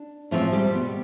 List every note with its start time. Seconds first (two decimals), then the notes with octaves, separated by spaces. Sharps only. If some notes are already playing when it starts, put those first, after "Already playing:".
Already playing: D4
0.31 A2 E3 F3 G3 C4 F4
0.53 G3 G4
0.73 B2 B3